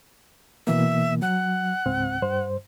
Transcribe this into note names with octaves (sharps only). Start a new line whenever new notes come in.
B2 E3 A#3 E5
F#3 F#5
C#2 G#2 C4
G2 C5